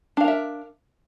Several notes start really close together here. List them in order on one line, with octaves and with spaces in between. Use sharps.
D4 F5 A#4 E5